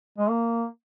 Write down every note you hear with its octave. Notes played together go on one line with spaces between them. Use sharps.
G#3
A#3